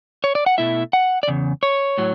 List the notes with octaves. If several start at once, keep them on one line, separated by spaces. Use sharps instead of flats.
C#5
D5
F#5
B2 A3 E4 E5
F#5
D5
E2 C#3
C#5
A2 F#3